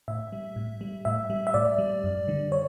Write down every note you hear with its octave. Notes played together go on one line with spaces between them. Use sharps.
A2 E5
G3
A2
G3
A2 E5
G3
E5
A2 D5
G3
F#2
D3 G3
C#5